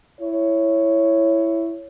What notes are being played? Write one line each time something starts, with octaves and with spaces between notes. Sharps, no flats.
E4 C#5